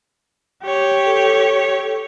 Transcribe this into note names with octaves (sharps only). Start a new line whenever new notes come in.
G4 C#5
A4